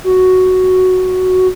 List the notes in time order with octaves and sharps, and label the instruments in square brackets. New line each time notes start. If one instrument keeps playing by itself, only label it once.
[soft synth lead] F#4